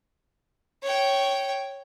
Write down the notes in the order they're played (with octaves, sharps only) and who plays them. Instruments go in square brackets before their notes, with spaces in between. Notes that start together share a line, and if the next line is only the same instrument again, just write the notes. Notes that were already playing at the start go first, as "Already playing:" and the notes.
[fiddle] C#5 G5